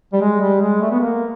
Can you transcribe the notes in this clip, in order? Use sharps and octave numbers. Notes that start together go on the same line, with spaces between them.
G3
G#3
G3
G#3
A3
B3
A#3